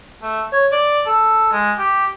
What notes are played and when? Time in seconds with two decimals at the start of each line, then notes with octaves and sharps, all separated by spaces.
0.23 A3
0.53 C#5
0.72 D5
1.06 A4
1.52 G#3
1.78 G4